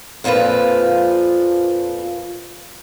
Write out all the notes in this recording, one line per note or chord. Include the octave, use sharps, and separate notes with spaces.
F2 A#2 F3 F4 B4